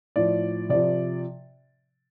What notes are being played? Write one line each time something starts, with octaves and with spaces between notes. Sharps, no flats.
A2 F3 D5
C3 F3 D5